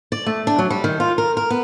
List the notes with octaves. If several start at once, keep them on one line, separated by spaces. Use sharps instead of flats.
D5
A3
D4
F#3
G3
D#3
F4
A#4
A#4
B3